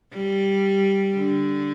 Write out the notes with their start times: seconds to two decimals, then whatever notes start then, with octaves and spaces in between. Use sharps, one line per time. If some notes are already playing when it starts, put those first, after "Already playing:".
0.14 G3
1.16 D3